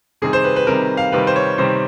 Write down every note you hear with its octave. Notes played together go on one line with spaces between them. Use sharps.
C3 D#3 G3 C4 G#4
C5
B4
B4
C3 D#3 G3 C4 A#4
F5
C3 D#3 G3 C4 B4
C5
C#5
C3 D#3 G3 C4 C5